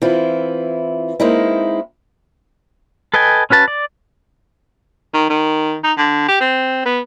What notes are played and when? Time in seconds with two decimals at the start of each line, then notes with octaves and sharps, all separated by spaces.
0.02 E3 C4 E4 F4
1.20 G#3 A#3 C4 D#4 E4
3.14 A4 B4 D#5 G5 G#5
3.50 C#4 F#4 B4 A5
3.68 D5
5.14 D#3
5.30 D#3
5.84 D#4
5.98 D3
6.28 G4
6.41 C4
6.85 B3